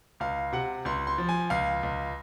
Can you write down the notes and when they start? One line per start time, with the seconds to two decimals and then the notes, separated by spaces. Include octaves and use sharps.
0.20 C#2 F5
0.53 C3 F#5
0.85 C#2 C6
1.07 C6
1.18 F3
1.29 G#5
1.50 C#2 F5
1.83 C#2